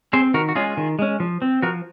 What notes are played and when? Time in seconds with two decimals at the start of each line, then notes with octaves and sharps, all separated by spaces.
0.13 C4 G#4 C5
0.34 D#3 F#4 A#4
0.49 F#4
0.55 G#3 C#4 F4 G#4
0.77 D#3
0.99 G#3 C#4
1.20 F3
1.42 C4
1.62 F3 F#4 A#4